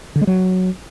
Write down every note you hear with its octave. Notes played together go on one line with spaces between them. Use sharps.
D3
G#3
F#3